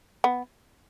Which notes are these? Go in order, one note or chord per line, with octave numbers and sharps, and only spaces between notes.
B3